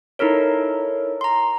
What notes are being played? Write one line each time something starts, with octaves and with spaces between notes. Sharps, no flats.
D#4 E4 A4 A#4 C#5
A#5 C6